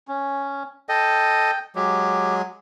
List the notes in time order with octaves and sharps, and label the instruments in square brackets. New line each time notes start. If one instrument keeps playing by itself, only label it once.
[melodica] C#4
[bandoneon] A4 D#5 [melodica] G5
[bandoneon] F#3 G#3 [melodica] G4